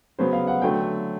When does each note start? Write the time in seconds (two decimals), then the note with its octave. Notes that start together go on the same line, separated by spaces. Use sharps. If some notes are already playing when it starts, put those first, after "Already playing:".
0.18 C#3 F#3 B3 C5
0.33 F5
0.47 F#5
0.62 D3 F#3 A3 G5